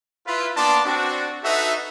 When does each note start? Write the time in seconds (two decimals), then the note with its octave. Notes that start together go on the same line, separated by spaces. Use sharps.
0.26 E4 F4 B4
0.56 A#3 B3 D4 A5 C6 D6
0.85 C4 D4 F#4
1.43 D#4 F#4 A4 B4 E5